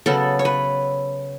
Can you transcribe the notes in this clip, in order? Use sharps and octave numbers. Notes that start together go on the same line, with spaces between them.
C#3 F#3 B3 A4
C#5
B4